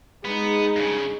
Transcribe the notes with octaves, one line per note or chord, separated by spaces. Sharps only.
G#3 B3 D#4
G2 C#3